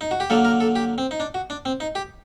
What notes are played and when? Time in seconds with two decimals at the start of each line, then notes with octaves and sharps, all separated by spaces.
0.01 D#4
0.11 F#4
0.20 G4
0.30 D3 F#3 A#3 A4
0.45 A#4
0.60 A4
0.75 G4
0.98 C4
1.11 D#4
1.20 D4
1.34 F#4
1.50 D4
1.65 C4
1.80 D#4
1.95 G4